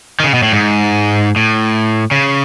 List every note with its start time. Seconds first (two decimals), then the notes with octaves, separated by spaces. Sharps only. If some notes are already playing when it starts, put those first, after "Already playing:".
0.20 D#3
0.24 C#3
0.34 B2
0.43 A2
0.53 G#2
1.36 A2
2.11 C#3